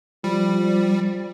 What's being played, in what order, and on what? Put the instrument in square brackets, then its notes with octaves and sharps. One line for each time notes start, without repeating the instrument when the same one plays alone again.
[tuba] F3 [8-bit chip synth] G3